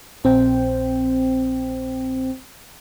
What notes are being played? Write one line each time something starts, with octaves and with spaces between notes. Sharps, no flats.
A#1 C4 C5 G5